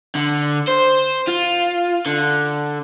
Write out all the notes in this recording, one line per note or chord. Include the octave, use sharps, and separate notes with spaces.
D3
C5
F4
D3